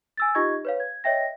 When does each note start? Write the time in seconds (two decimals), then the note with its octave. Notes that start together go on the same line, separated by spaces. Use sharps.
0.17 G#5 E6 A6
0.35 D#4 F4 G4 D#5 C#6 G#6
0.65 B4 C#5 F5
0.80 G#6
1.04 C#5 D#5 E5 G5 A#6